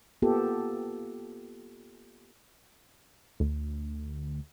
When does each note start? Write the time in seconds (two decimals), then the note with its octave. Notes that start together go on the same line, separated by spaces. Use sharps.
0.22 A#3 B3 F4 G4 A4
3.40 D2